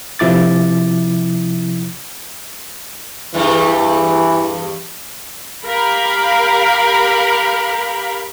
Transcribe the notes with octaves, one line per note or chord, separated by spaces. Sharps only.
C3 F3 E4 D6 A6
E2 G2 E3 G3
G4 A#4 F5 B5